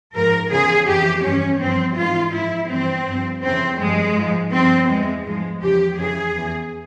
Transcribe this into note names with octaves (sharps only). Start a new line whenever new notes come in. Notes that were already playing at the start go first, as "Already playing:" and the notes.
G#2 F3 A#4
E2 C#3 F3 G#4
F2 E3 G4
G2 E3 C#4
G2 F3 C4
G#2 E3 F4
G#2 F3 E4
G2 E3 C4
G2 F3
F2 C#3 E3 C4
G2 F3 G#3
G#2 F3
G2 F3 C4
E2 E3 G#3
G#2 F3 G#3
E2 C#3 F3 G4
F2 C#3 E3 G#4
E2 E3